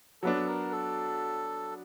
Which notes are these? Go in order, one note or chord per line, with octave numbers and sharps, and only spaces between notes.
F#3 B3 D4 A4
A#4
A4